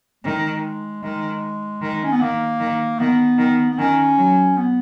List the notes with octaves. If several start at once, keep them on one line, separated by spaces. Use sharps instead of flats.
D#3 G#3
D#3 G#3
D#3
C#4
B3
D#3 A#3
D#3
D#3 B3
D#3
B3
D#3 C#4
F#3
B3